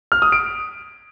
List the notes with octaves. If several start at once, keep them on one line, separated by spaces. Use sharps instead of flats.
F6
D#6
D7